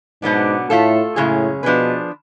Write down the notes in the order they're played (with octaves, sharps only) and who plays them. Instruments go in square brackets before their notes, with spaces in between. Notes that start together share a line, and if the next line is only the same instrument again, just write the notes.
[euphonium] G#2 [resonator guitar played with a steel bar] B2 F#3 B3 D4
[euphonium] A2 [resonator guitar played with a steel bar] A3 F4 A4
[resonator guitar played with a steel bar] F#2 C#3 G#3 C#4 G#4 [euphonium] A2
[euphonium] B2 [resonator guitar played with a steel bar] F3 B3 D4 G#4 B4